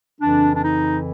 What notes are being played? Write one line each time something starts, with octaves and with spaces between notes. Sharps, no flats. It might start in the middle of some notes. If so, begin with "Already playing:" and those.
F2 C#3 E3 D4
D4
D#4